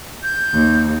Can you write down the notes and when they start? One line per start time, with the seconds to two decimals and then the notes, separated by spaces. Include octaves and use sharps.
0.23 G6
0.54 D#2